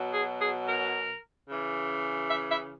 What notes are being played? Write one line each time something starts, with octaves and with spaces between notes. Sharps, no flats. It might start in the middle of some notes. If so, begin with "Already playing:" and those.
Already playing: B2 F#3
G#4
G#4
A#4
C#3 E3
E5
E5